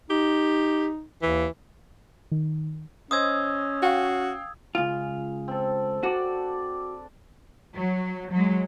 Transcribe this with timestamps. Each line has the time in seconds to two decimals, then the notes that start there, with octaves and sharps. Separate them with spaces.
0.10 D#4 G4
1.22 D#2 E3
2.31 D#3
3.11 C#4 C5 D#5 D#6 E6 G#6
3.82 F#4 F5 G5
4.75 C#2 F4 G#4
5.48 C4 A4
6.03 D4 F#4 D5
7.75 F#3
8.32 F#3 G#3